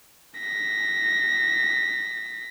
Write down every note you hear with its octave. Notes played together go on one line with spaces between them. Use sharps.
A#6 B6